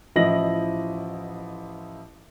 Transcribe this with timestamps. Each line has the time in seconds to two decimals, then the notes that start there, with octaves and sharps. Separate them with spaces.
0.16 A1 F3 E4 D#5 A#6 F#7